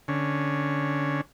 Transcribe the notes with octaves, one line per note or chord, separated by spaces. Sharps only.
D3 C#4